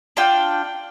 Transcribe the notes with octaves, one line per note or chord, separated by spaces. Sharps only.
D4 F4 G5